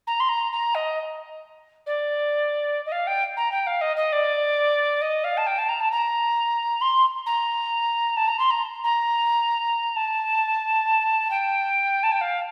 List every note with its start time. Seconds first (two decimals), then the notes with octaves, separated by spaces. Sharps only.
0.07 A#5
0.20 C6
0.29 A#5
0.52 A#5
0.74 D#5
1.86 D5
2.86 D#5
2.92 F5
3.07 G5
3.37 A#5
3.51 G5
3.66 F5
3.81 D#5
3.96 D#5
4.12 D5
5.01 D#5
5.24 F5
5.37 A5
5.46 G5
5.58 A5
5.69 A#5
5.80 A5
5.91 A#5
6.81 C6
7.26 A#5
8.16 A5
8.27 A#5
8.39 C6
8.50 A#5
8.84 A#5
9.96 A5
11.30 G5
12.03 A5
12.12 G5
12.21 F5